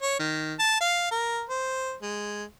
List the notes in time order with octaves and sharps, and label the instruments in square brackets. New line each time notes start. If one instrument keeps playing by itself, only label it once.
[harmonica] C#5
D#3
A5
F5
A#4
C5
G#3